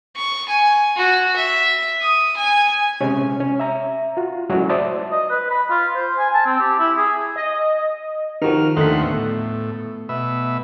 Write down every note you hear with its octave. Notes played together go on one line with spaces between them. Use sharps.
C#6
G#5
F#4
E5
D#6
G#5
C3 G#3 C#4
C#4
E5 A#5
F4 F#4
F#3 G#3 A3 C#4 E4 F#4
C5 D5 E5 A5 D#6 A6
D#5
B4
B5
F4
C5
G#5
A5
C4
G4
E4
G#4
D#5
D#3 F3 F#4 G4 A#4 F6
D#2 D3 A3 D#4 C5 F#5 B6
A2 B3
B2 E5